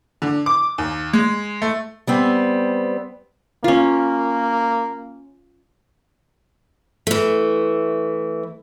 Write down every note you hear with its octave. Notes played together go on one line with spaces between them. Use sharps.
D3
D6
D#2
G#3
A3
G3 B3 C4
A#3 C#4 F4
E3 A3